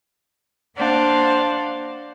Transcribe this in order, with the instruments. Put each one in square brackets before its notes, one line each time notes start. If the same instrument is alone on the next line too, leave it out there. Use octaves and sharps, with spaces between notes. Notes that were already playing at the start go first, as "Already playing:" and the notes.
[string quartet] A#3 D4 C5 F5 F#5